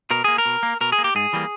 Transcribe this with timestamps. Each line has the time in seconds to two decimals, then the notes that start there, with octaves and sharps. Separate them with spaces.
0.11 B2 A#4
0.24 A#3 G#4
0.38 A#4
0.45 B2
0.63 A#3
0.81 B2 A#4
0.92 G#4
0.98 A#3
1.04 G4
1.15 G#2 G#4
1.33 E3 G3 A#3